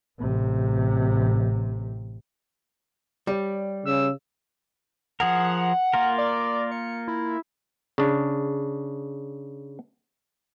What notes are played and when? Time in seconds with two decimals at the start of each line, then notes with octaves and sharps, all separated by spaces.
0.19 A1 C3
3.27 G3 G4 C#5 D5
3.86 C#3 E6
5.20 F3 G#4 A#4 F#5
5.93 A#3 F4 A#4
6.18 D5
6.71 C#7
7.08 E4
7.98 C#3 D4